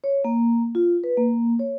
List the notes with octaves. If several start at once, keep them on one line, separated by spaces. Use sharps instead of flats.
C#5
A#3
F4
B4
A#3
C#5